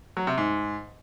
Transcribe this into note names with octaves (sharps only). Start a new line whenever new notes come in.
F#3
C3
G#2